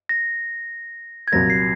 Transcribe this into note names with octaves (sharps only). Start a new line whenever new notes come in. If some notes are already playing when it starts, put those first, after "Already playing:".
A#6
G#6
C2 A#2 F#3 A#3 A#6
C7